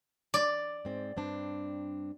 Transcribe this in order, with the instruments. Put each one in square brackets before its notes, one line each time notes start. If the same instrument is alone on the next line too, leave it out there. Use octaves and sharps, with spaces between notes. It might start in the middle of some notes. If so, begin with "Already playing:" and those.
[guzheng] D5
[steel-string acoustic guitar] G#2 C4
G2 C4 D4